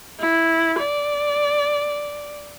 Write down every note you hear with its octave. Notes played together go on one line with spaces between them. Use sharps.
E4
D5